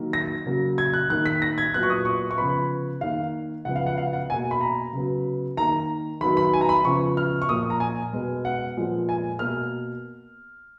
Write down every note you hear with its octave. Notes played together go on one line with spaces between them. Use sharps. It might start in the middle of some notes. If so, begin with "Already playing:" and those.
Already playing: D#3 F#3 A#3
A#6
C#3 F#3 A#3
G#6
F#6
D#3 A#3 F#6
B6
A#6
G#6
A#2 F#3 B3 F#6
C#6
D#6
C#6
C#6
C#3 F3 B3 B5
D#3 A#3 F5
C#3 F3 G#3 B3 F#5
F5
F#5
F5
F#5
B2 A#3 G#5
B5
A#5
C#3 F#3 B3
D#3 A#3 A#5
D#3 F#3 B3 B5
B5
G#5
A#5
B5
C#3 F3 B3 C#6
F6
C#6
A#2 F3 A#3 D#6
A#5
G#5
B2 G#3 B3
F#5
A#2 F3 G#3 B3
G#5
B2 A#3 F6